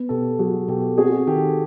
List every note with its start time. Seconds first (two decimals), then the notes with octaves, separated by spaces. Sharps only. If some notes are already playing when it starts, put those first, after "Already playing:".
Already playing: B3
0.09 B2 G4 A4
0.39 F#3 F#4 G#4
0.68 B2 G4 A4
0.98 C4 F#4 G#4
1.27 D#3 G4 A4